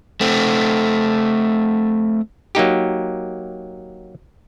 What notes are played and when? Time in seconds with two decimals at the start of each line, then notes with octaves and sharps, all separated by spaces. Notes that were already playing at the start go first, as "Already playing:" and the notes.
0.21 A3 C4
2.55 F#3 A#3 D#4 G4